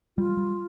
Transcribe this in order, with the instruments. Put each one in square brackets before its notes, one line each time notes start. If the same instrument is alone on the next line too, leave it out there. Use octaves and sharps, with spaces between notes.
[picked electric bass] G3 [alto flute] F4
[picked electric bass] G3